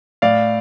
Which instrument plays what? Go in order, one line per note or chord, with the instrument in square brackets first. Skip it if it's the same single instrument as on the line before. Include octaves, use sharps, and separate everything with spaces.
[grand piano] A2 D5 F5